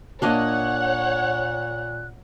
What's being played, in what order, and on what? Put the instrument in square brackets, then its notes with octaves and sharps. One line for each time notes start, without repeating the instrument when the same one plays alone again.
[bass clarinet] A#2 [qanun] A#3 D4 D#5 [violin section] C#5 F#5 [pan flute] F#6